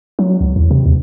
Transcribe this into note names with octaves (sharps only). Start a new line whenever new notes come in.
F#3
C#2
E2
C3
D#2